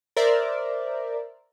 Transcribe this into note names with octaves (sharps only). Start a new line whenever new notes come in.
A#4 C5 D5 E5